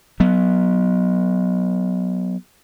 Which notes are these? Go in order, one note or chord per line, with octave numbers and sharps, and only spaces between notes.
F#3 B3